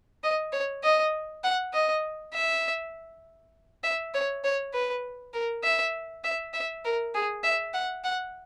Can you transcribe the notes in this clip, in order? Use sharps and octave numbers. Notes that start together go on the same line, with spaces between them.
D#5
C#5
D#5
F#5
D#5
E5
E5
C#5
C#5
B4
A#4
E5
E5
E5
A#4
G#4
E5
F#5
F#5